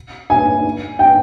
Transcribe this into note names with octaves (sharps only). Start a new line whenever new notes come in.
G#5
G5